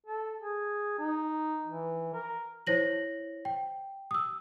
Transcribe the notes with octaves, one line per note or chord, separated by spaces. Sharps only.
A4
G#4
D#4
E3
A#4
E4 C5 C#5 A#6 F#7
G5
D#6 E6